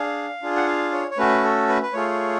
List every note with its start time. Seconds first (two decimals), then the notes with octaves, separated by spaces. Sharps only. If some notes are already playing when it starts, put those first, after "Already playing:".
Already playing: D4 G#4 F5
0.43 D4 F4 G#4
0.56 F#5
0.67 F5
0.92 C#5
1.11 C#5
1.17 A3 C#4 F#4 B4
1.44 A4
1.69 B4
1.83 B4
1.93 A3 F4 G#4 C#5